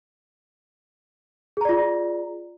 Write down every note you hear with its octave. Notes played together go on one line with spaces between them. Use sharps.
F4 G#4 D5 A#5